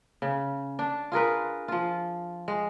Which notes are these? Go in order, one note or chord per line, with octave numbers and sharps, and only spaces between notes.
C#3
D4
F4 G#4 A#4 B4
F3 F4
G#3